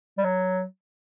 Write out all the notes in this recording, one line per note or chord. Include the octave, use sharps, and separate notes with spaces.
G3
F#3